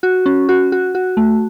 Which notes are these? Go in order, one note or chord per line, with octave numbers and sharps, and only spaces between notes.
F#4
C#4
F#4
F#4
F#4
A3